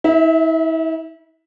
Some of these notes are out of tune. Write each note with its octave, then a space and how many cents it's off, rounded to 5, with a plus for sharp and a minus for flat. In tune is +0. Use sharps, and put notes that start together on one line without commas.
E4 -40 E5 +0